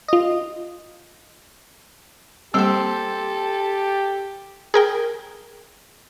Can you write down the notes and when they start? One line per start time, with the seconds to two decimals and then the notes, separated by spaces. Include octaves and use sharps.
0.08 F4 D#5
2.54 G3 A#3 C4 G4 A4 C5
4.74 G#4 A#4 G5